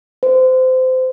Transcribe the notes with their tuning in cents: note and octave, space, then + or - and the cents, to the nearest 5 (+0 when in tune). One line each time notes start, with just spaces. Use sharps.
C5 -25